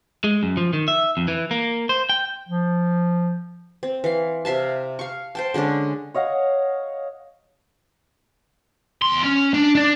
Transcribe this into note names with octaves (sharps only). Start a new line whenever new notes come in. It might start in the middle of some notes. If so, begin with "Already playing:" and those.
G#3
F#2
F3
D#3
E5
F2
E3
A#3
C5
G5
F3
C4
E3 F5
C3 E5 F5 A5
F5 C#6
C5 G5 A5
D3 G#3 C#4 D4
C#5 D#5 F5 F#5
E2 C6
C#4
D4
D4 D5